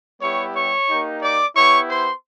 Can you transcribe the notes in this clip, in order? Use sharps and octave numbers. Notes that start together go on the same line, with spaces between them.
G3 B3 E4 G4 C#5 C#6
C#5 C#6
A#3 D#4 G4
D5 D6
B3 E4 G4 C#5 C#6
C5 C6